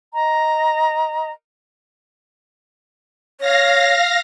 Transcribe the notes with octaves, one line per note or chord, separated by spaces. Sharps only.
D#5 A#5
C#5 F5 A#6